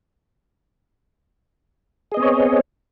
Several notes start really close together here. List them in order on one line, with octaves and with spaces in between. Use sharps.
G#4 D#5 B3 C4 C#5